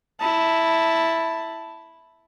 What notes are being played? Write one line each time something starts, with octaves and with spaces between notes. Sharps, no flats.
E4 A5